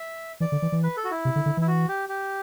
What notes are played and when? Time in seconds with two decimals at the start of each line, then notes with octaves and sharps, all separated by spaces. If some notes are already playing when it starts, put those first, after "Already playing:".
Already playing: E5
0.40 E3 D5
0.52 D3
0.62 E3
0.72 E3
0.83 B4
0.97 A4
1.05 F#4
1.11 E4
1.25 C3
1.36 D3
1.46 D3
1.57 E3 E4
1.68 F#4
1.88 G4
2.09 G4